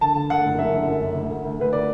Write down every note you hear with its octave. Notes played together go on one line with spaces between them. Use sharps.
D3 A5
D3
D3 F#5
F#1
F#2 E5
D3
F#2
F#1
D2
D2
D2
D2 B4
D5